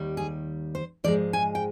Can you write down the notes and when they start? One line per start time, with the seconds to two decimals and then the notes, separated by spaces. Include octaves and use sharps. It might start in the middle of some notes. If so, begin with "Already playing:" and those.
Already playing: D#2 D#3 G3
0.17 G#4
0.75 C5
1.04 G#2 F3 G#3 D5
1.33 G#5
1.55 G5